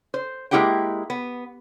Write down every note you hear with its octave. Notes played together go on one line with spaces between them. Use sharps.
C5
G#3 A#3 E4 G4 F#5 G5
B3